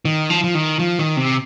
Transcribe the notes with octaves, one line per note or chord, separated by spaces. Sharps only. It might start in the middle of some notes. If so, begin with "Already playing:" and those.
D#3
F3
F3
D#3
F3
D#3
C3